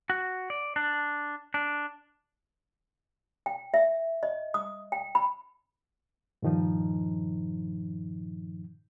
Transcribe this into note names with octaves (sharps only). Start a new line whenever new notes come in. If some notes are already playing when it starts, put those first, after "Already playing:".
F#4
D5
D4
D4
G5
E5
D#5
D#6
G5
B5
G2 A#2 D#3 F3 D#4